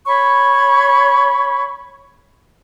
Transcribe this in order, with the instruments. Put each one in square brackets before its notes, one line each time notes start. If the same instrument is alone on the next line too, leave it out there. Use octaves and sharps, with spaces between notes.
[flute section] C#5 B5 C#6